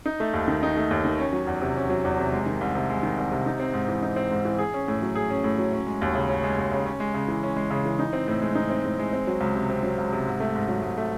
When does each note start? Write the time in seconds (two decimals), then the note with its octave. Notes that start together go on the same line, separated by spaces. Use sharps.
0.06 D#4
0.20 A3
0.33 D#2
0.48 D#3
0.63 D#4
0.77 A3
0.91 D#2
1.05 D#3
1.19 C#4
1.33 F#3
1.47 E2
1.61 C3
1.76 C#4
1.90 F#3
2.05 E2
2.18 C3
2.33 G#3
2.46 D#3
2.61 C2
2.75 C3
2.90 G#3
3.03 D#3
3.18 C2
3.31 C3
3.46 D#4
3.60 C4
3.74 G#2
3.88 E3
4.02 D#4
4.16 C4
4.31 G#2
4.45 E3
4.59 G#4
4.74 C#4
4.88 A2
5.02 F#3
5.15 G#4
5.31 C#4
5.44 A2
5.58 F#3
5.73 C#4
5.87 G#3
6.01 D#2
6.15 C#3
6.29 C#4
6.43 G#3
6.58 D#2
6.71 C#3
6.86 C#4
7.00 G#3
7.14 C#3
7.28 E3
7.43 C#4
7.56 G#3
7.70 C#3
7.85 E3
7.99 D#4
8.13 C4
8.28 A2
8.42 G#3
8.55 D#4
8.70 C4
8.85 A2
8.99 G#3
9.13 C4
9.27 F#3
9.41 C#2
9.55 C3
9.70 C4
9.83 F#3
9.98 C#2
10.13 C3
10.26 G#2
10.40 A3
10.55 G#2
10.68 F#3
10.83 G#2
10.97 A3